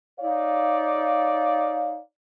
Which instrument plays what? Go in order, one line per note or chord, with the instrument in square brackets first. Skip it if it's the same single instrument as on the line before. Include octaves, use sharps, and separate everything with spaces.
[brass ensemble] D#4 C#5 D5 F5